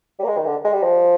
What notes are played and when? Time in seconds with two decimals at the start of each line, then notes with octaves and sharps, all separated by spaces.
0.20 G3
0.24 A#3
0.28 G#3
0.38 D#3
0.46 D3
0.65 G#3
0.73 G3
0.83 F3